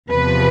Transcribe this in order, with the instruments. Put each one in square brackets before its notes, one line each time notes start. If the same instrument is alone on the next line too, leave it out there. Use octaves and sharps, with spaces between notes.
[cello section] E2 C3 F3 B4